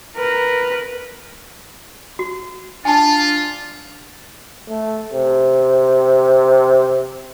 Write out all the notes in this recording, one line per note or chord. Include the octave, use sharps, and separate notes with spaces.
A#4 B4
F#4
D4 F4 G#5 A5
A3
C3